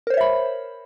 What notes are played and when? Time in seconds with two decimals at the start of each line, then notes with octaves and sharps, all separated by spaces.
0.07 A#4
0.10 C5
0.14 C#5
0.17 E5
0.21 B5